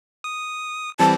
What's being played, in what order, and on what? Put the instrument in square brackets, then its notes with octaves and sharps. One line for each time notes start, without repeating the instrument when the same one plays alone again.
[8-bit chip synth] D#6
[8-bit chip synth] E3 G3 C4 [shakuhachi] A5